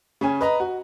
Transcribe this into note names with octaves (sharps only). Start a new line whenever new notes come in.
C#3 C#4 G#5
B4 D#5 A#5
F#4